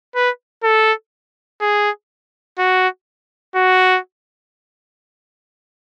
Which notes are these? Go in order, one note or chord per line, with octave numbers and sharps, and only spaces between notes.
B4
A4
G#4
F#4
F#4